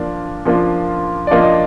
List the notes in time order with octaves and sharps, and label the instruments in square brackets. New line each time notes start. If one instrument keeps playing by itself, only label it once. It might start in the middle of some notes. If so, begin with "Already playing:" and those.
Already playing: [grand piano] F3 A#3 D4 F4
F3 A#3 D4 F4
D5
F3 A#3 D4 F4 D#5
D#5